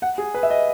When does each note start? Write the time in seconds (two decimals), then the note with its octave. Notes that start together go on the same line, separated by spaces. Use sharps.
0.02 F#5
0.18 G#4
0.34 B4
0.43 E5
0.50 D#5